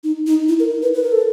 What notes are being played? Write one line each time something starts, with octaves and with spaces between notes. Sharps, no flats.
D#4
D#4
E4
A#4
B4
B4
A#4
A4